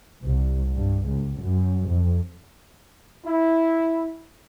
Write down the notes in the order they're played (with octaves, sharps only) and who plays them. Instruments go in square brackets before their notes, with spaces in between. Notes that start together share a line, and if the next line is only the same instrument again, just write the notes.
[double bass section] C2
G2
C#2
F#2
F2
[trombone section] E4